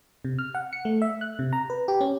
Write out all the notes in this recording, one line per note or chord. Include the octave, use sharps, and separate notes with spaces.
C3
F6
F#5
C#7
A3
E5
F#6
C3
A#5
B4
G4
C#4